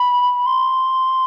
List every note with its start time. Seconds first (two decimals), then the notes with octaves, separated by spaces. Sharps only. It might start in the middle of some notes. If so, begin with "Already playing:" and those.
Already playing: B5
0.46 C6